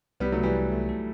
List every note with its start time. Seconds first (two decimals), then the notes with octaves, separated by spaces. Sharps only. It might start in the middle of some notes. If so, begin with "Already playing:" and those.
0.20 C2 G3 B3
0.32 F#3 A3
0.38 C2
0.43 E3 G3
0.55 A3
0.72 A3
0.89 A4